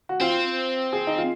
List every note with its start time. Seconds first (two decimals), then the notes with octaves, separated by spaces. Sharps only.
0.09 F#4
0.21 C4 F4
0.93 G#4
1.07 D#4
1.18 F4